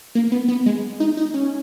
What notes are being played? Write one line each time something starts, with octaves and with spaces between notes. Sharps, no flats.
A#3
B3
B3
G#3
D#4
D#4
C#4